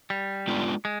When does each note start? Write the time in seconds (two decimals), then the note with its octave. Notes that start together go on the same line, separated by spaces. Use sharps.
0.10 G3
0.48 G#3 B3 D4 F4
0.85 G#3